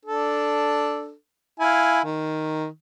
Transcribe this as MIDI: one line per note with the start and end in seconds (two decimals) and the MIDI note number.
0.05 1.12 62
0.05 1.12 69
1.60 2.00 64
1.60 2.00 77
1.60 2.00 80
2.04 2.66 51